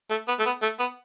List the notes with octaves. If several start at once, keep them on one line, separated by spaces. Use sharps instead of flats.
A3
B3
A3
B3
A3
B3